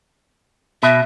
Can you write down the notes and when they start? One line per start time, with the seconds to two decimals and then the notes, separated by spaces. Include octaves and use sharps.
0.83 B2 E5